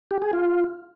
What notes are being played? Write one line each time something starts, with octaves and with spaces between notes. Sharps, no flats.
G4
G#4
F4